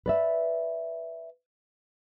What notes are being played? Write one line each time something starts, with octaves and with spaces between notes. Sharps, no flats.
B4 D5 E5